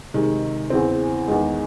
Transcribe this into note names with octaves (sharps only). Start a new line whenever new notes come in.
C3 D#3 G#3
E2 C#3 E3 C4
E2 D#3 G#3